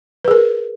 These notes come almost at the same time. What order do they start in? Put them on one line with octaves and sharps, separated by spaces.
B4 G#4 A#4